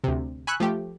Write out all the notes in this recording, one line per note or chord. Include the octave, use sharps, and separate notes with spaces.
D2 C3
G#5 B5 C#6 E6 F#6
F3 A3 G4